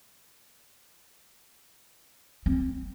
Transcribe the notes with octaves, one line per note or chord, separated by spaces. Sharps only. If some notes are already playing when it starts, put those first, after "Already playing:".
C4